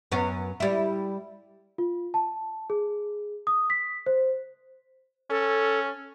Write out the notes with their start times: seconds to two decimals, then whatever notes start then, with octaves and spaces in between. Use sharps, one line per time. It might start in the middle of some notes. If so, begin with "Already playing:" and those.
0.12 F#2 B3 C#4
0.60 G3 E4
1.78 F4
2.14 A5
2.70 G#4
3.47 D#6
3.70 B6
4.06 C5
5.30 C#4 A4